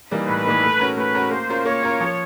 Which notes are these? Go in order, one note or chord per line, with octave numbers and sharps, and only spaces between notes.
E3 G3 A#3 D#4
A2 B4
E3 G3 A#3 D#4
A3
C#4 F#4 A#4
A3 B4
C#4 F#4 A#4
A#3 C5
C#4 F4 A#4
A#3 C#5
C#4 F4 A#4
F3